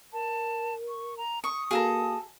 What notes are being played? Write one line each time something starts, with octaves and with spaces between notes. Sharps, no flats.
A#4 A5
C#6
A#5
C#6 D#6
A#3 F#4 G#4 A4 F5 G#5 A#5